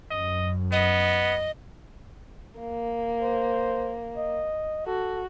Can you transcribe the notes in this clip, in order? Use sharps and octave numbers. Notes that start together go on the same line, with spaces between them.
F#2 D#5
B3 D#5
A#3
C5
D#5
F#4 A4